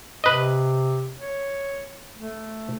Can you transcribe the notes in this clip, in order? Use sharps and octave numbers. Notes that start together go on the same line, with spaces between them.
C3 B4 D#5
C#5
A3